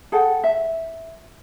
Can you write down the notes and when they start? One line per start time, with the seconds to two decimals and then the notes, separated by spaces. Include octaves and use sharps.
0.12 G#4 A4 F#5 G5
0.44 E5